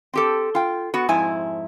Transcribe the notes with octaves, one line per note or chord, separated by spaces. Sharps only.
C4 G4 A4
F4 G5
B3 F#4
F2 G#2 E4 G#5